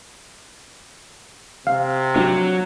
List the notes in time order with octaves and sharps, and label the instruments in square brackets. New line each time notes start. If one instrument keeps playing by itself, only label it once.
[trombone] C3 [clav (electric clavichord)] F5
[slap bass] F3 C4 D4 [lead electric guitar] F#3